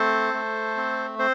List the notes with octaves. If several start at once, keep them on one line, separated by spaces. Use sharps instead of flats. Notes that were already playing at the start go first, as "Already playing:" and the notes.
Already playing: A3 C4 A4 C5
A3
C4
C4 C5